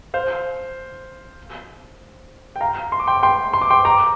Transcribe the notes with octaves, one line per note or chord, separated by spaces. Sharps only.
C5 F5
G5
F5 A#5
C6
D6
G5 C6
G5 C6
C6
D6
G5 C6
A#5 D6